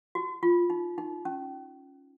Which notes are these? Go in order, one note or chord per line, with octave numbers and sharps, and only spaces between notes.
F#4
F4
D#4
D#4
C#4